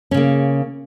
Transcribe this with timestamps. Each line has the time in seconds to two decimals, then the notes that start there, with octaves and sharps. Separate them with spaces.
0.11 C#4
0.14 C#3
0.17 A#3